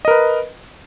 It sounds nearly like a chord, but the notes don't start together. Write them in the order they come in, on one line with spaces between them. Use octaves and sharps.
D#5 A#4 B4